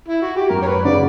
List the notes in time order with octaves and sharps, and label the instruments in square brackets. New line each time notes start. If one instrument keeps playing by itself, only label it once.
[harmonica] E4
F#4
G4
[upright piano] F#2 [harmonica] A#4
[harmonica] C#5
B4
[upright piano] C#3 F#3 C#4 [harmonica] D5